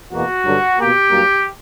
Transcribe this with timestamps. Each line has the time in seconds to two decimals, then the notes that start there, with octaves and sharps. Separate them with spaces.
0.13 E2 B2 A#3 F#4
0.45 G2 D3 F#3
0.78 B2 A#3 G4
1.10 G2 F#3 A#3